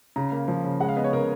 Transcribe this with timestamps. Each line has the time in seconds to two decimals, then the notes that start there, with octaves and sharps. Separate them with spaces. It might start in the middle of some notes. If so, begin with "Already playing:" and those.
0.16 C#3 A#5
0.32 A#3
0.48 F3
0.64 C#3
0.80 G#3 F#5
0.89 F5
0.96 B3 D#5
1.04 C#5
1.13 C#3 A#4